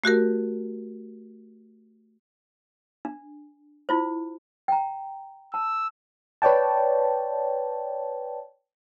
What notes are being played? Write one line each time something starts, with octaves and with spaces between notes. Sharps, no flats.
A3 F#4 G4 A#4
D4
E4 F4 C5
G5 A#5
A5 E6
B4 C#5 D5 G5 A5